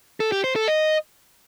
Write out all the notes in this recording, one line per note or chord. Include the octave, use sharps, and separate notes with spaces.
A4
G4
C5
A4
D#5